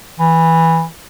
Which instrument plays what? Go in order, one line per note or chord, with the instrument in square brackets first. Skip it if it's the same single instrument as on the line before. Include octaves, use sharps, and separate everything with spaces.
[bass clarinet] E3